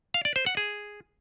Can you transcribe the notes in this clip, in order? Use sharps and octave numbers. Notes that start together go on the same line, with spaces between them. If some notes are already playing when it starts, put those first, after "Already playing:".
F5
D5
C5
F#5
G#4